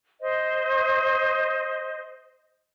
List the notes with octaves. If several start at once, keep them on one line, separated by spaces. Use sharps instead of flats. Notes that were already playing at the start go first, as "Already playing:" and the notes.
C5 D#5